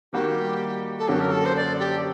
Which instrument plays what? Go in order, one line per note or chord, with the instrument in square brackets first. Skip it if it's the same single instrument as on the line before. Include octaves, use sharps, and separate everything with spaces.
[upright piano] D#3 G3 A#3 F#4 [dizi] G4
[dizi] A4
[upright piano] F#2 D3 F#3 A#3 F#4 [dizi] G4
[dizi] A#4
A4
C5
D5
G4